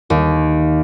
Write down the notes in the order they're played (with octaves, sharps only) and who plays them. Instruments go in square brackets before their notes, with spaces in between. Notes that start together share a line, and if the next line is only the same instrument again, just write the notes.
[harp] D#2